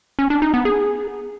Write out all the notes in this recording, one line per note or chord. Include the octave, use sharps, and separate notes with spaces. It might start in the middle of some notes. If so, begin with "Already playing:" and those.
C#4
D4
D#4
B3
G#4